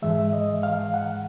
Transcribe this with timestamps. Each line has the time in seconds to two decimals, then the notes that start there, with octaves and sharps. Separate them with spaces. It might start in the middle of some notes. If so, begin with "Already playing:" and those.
0.02 G#2 E3 G#3 E5
0.33 D#5
0.63 F5
0.94 F#5